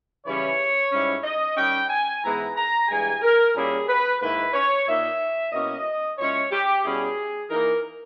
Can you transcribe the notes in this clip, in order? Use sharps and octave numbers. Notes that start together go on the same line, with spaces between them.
C#3 E3 G3 C#4 E4 C#5
G#2 G3 C#4 E4
D#5
D#3 G3 C#4 G5
G#5
G#2 E3 G#3 B3 E4 A#5
A#5
G2 E3 G#3 G#5
A#4
A#2 G3 A#3 C#4 E4 G#4
B4
G#2 D#3 A#3 E4 B4
C#5
A#2 A#3 D#4 E5
B2 A#3 C#4 E4 D#5
A#2 G#3 C#4 E4 C#5
G4
B2 G3 C#4 E4 G#4
E3 A#3 D#4 A#4